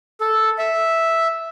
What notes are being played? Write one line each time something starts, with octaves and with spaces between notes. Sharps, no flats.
A4
E5